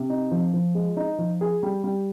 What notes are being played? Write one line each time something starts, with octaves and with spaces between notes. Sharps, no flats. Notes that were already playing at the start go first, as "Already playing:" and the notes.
Already playing: C3
D#4
F3
F3
G#3
D#4
F3
G#4
G3
G3